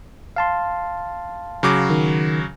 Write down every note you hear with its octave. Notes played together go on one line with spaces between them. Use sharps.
F5 A5 C6
C#3 F#3 D6
D#3